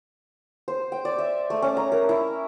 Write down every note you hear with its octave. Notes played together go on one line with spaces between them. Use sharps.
C5
G5
D5
E5
A3
C#4
A#5
A#4
E4